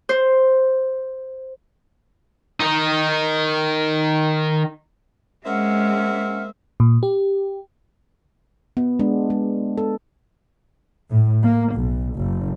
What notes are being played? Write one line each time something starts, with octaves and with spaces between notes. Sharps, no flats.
C5
D#3 D#4
G#3 A#3 C4 C#4 E5 F#5 F6
A#2
G4
B3
G#3 D4
G#3
A4
A2
A#3
B1
F#1